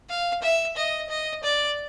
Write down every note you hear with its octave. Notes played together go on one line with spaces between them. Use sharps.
F5
E5
D#5
D#5
D5